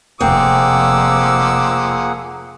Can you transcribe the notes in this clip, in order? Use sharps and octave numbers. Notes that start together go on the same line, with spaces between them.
F1 F3 A#3 C4 G#4 F#5 D6 E6